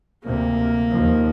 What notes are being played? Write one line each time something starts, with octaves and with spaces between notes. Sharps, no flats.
D2 C3 A#3
D#2 F3